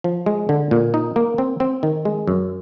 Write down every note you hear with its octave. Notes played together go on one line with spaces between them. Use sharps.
F3
G#3
D3
A#2
D#4
A#3
C4
C4
D#3
G#3
F#2